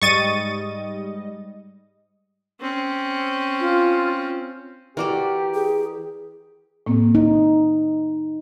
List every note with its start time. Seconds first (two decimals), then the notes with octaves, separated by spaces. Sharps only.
0.02 G#2 G3 D#5 C#6 A6 D#7
2.61 C4 C#4
3.60 F4
4.97 E3 F#4 G4 A4 A#4 D5
5.55 G#4
6.86 A2 A#3 C4
7.15 D#4